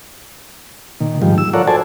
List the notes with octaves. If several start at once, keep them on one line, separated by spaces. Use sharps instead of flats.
A#2 D#3
G#2 D#3 F3 G3
E6
F4 A4 A#4 C#5 D5 F#5
F#4 A4 C5 D5 G#5 A5